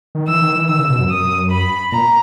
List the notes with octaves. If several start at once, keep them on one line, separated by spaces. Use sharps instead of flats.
D#3
E3 E6
D#3
E3
D#3 E6
C#3
B2
F#2
D#6
B5
A#2 A#5